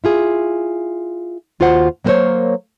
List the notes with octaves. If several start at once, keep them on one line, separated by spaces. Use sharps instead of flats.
E4 F4 G#4
D#2 F4 F#4 C5 F#5
F#3 A#3 B3 A#4 C5 C#5